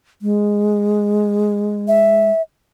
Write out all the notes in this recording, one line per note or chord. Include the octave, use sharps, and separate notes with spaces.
G#3
E5